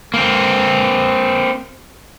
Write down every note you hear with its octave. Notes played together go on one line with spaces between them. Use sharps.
A#3 C4